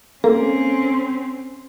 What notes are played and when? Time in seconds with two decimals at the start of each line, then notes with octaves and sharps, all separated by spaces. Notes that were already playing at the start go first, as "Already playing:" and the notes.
0.24 A#3 C4 C#4 A4